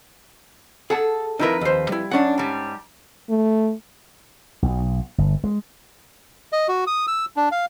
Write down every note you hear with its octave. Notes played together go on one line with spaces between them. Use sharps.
G#4 A4 F#5 A5
F2 D#4 E4 A#4 B4
D#2 C5
G3 E4
F#2 C#4 D4 F#5
G#2 G3
A3
B1
G1
G#3
D#5
F#4
D#6
E6
D4
F5